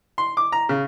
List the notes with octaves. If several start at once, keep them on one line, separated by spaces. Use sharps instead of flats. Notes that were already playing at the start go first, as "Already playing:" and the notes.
C6
D6
A#5
C#3